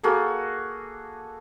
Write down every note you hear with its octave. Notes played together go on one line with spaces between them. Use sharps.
A#3 F#4 G#4 A4